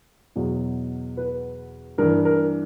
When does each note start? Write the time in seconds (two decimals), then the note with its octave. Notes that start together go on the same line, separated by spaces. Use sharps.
0.36 E2 B2 F#3
1.17 B4
1.98 G2 E3 A#4
2.25 A#4